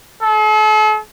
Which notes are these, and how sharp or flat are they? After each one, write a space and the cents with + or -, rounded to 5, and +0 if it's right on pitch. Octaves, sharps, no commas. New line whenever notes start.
A4 -45